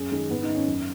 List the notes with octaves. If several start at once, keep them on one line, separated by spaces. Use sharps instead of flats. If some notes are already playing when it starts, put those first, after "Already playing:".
Already playing: F#2 G#4
D#3 G#3
G#2 B3
D#4
D#3
C#4
F#2